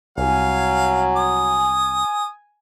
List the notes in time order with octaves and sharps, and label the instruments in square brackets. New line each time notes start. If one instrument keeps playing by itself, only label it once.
[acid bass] C2 [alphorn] F#3 [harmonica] F5 [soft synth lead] G#5
[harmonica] D#6